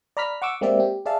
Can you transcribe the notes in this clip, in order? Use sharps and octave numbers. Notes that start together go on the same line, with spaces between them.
D5 A#5 B5 F6 B6
F#5 C#6 D6 E6
G#3 A#3 C4 G4 D5 E5
G4
G#4 D5 E5 F5 A5